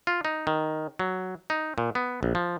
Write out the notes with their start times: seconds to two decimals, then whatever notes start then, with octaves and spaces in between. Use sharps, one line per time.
0.07 F4
0.25 D#4
0.47 D#3
0.99 F#3
1.50 D#4
1.78 A#2
1.95 B3
2.23 A#1
2.35 F3